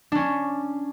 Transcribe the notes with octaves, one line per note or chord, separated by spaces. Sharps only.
C#4 D4